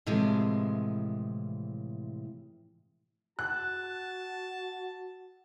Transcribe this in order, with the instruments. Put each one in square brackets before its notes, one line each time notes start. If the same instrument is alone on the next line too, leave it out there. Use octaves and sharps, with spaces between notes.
[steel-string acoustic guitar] A2 C3 E3 F3 G#3
[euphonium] F#4 [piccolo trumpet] A5 [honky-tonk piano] F#6